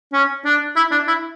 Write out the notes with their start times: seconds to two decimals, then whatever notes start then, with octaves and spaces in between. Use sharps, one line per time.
0.13 C#4
0.45 D4
0.76 E4
0.91 D4
1.07 E4